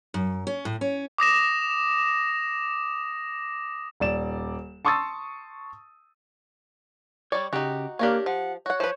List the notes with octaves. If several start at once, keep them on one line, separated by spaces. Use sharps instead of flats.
F#2
C#4
A2
C#4
D6 D#6 A#6 E7
D#1 D5 E7
A5 C6 C#6 D#6 E6 A6
G3 C#5 D5
C#3 D#4 F#4 G4
A#3 D4 G4 A#4 C#5 F5
F3 F#5
F#4 C#5 F#5
F3 B4 C5